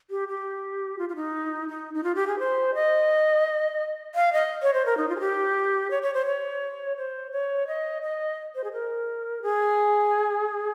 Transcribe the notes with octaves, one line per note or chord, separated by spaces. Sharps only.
G4
G4
F4
F4
D#4
D#4
D#4
F4
G4
G#4
C5
D#5
F5
D#5
C#5
C5
A#4
D#4
F4
G#4
G4
C#5
C#5
C5
C#5
C5
C#5
D#5
D#5
C5
G#4
A#4
G#4